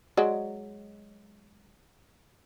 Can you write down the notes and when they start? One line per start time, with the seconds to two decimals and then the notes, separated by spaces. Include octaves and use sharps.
0.17 F#3 G#3 D5